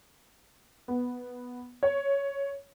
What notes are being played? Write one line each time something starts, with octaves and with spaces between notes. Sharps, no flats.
B3
C#5